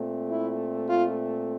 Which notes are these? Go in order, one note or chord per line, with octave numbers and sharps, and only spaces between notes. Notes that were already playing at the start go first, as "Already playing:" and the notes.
Already playing: A#2 A3 C4
E4
F4